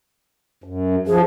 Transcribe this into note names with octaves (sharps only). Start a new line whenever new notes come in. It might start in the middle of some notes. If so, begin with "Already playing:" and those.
F#2
F3 G#4